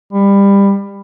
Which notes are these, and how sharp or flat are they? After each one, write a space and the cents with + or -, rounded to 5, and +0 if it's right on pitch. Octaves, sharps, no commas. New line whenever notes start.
G3 +20